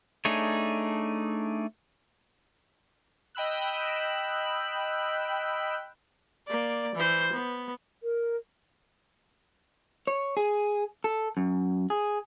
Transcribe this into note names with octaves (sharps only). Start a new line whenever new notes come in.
A3 D4 D#4 G#4 C#5
D#5 G5 B5 E6 F#6
A#3 D5
E3 C5
B3
A#4
C#5
G#4
A4
F#2
G#4